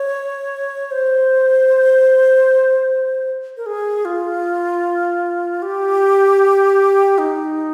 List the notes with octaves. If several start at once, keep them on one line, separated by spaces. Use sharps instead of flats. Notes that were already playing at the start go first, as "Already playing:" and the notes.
Already playing: C#5
C5
A#4
G#4
F4
G4
D#4